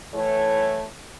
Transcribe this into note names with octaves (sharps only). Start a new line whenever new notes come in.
A2 E3 A3 E4 C#5